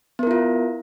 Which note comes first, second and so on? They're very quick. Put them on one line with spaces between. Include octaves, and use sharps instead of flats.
B3 A#4 E4 F4